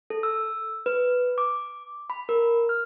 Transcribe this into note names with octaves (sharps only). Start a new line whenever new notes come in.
A4
E6
B4
D6
B5
A#4
F6